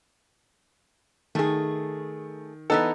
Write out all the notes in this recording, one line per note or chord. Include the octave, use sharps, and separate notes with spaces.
D#3 A3 G#4
E3 B3 D#4 A4